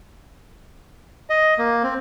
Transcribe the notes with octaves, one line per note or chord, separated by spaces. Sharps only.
D#5
A#3
C4